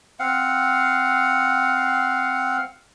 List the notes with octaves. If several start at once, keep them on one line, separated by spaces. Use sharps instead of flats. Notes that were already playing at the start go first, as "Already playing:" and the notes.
C4 F5 F#5